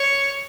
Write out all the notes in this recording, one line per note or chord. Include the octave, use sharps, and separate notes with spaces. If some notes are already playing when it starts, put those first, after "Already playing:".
Already playing: C#5